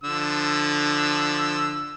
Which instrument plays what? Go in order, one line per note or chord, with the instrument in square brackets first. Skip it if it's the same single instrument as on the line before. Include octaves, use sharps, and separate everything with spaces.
[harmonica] D3 F3 E6